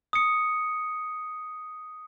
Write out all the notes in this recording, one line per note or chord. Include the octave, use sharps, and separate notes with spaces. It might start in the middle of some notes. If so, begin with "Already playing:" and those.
D#6 C#7